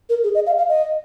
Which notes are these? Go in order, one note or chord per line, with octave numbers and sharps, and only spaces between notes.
A#4
G#4
D#5
F5
F5
D#5